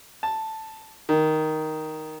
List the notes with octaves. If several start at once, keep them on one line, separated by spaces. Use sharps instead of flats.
A5
D#3